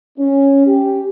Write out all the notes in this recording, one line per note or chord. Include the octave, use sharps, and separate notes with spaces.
C#4
G4